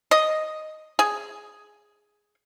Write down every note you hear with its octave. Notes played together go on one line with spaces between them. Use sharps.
D#5
G#4